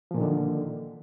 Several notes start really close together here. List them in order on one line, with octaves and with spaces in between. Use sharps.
F3 A#2 D#3 D3